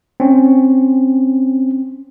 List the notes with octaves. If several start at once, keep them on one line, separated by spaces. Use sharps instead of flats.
C4 C#4